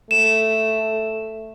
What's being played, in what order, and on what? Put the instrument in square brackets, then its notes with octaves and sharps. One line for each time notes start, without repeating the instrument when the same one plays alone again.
[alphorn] A3 [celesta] E7